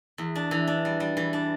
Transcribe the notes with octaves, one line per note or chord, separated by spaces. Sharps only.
E2
D4
E3
D4
G3
G3
E3
D4